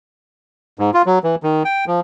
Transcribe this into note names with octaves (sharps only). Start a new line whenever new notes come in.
G#2
F4
F#3
E3
D#3
G5
F3